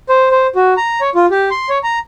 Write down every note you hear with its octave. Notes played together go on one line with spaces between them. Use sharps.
C5
C5
F#4
A#5
C#5
F4
G4
C6
C#5
A#5